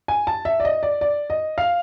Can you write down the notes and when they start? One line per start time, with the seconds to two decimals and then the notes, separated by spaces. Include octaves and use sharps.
0.08 G#5
0.27 A5
0.45 E5
0.60 D5
0.65 D#5
0.83 D5
1.01 D5
1.30 D#5
1.58 F5